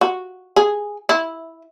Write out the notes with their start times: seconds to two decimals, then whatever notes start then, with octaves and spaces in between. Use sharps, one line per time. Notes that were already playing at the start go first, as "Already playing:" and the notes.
0.01 F#4
0.56 G#4
1.09 E4